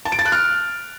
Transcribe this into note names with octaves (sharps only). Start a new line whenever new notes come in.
A5
D7
A6
F#6
F6